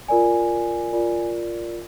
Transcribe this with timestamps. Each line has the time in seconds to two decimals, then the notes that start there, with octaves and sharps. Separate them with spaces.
0.08 F4 A#4 D5 G#5
0.92 F4 A#4 D5